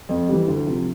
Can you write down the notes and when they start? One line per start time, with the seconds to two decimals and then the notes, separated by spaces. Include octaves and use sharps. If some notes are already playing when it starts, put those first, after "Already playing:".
0.09 F2
0.29 E3 G3
0.48 D2
0.66 C3 F3